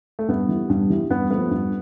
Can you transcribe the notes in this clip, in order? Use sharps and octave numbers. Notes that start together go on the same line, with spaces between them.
A3
G2 B3
E3 G3
G2
E3 G3
G2 B3
F3 A3 B3
G2